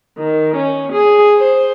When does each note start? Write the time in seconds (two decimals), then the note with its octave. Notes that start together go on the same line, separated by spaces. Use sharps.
0.18 D#3
0.56 C#4
0.91 G#4
1.36 C5